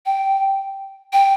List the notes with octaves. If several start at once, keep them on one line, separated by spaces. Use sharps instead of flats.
G5
G5